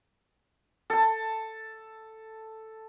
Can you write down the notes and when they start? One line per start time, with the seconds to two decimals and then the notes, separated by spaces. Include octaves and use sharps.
0.90 A4 A5